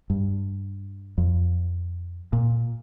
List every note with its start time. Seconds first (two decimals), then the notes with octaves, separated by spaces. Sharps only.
0.10 G2
1.18 F2
2.33 A#2